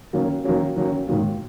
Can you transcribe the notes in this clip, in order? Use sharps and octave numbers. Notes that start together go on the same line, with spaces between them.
D#3 F#3 A#3 C#4
D#3 F#3 A#3 C#4
D#3 F#3 A#3 C#4
G#2 D#3 F#3 A#3